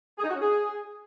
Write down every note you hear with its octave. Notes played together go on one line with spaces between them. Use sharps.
G#4
D#4
F#4
C#4
G#4